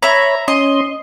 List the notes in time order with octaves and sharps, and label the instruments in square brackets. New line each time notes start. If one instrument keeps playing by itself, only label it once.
[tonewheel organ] C#5 B5 [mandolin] E5 A#5
[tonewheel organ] C#4 C6 [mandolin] D#5